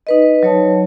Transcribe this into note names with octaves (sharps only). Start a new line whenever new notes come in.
D#4 B4 D#5
F#3 C#5 A5